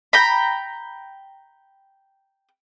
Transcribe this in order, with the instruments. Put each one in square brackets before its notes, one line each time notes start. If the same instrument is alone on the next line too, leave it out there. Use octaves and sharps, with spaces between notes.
[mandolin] G5 A#5 B5